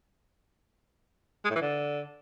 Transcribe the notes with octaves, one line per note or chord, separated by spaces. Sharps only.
G#3
A2
E3
D3